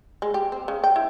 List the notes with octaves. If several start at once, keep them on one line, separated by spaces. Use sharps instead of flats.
G#3
G4
C4
C#3
G5
E4